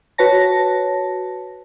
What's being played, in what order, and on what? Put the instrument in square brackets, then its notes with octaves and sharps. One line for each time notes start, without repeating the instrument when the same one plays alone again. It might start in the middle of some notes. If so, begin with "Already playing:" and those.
[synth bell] F#4 B4 C#5 A5 A#6